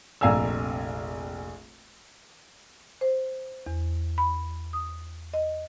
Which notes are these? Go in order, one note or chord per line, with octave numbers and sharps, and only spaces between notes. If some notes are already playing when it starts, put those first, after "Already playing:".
F1 A#1 F5 G#5 A#5 E6
C5
E2
B5
D#6
D#5